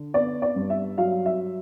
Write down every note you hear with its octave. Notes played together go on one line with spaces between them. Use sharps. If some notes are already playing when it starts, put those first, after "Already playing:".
Already playing: D3
B3 D5
D5
G2
E5
F#3 F5
E5